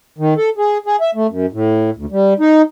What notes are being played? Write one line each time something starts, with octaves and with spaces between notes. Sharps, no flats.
D#3
A4
G#4
G#4
E5
A3
F#2
A2
D2
G3
D#4